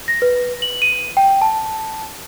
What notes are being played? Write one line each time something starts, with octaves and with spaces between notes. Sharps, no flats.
A#6
B4
F#7
D#7
G5
A5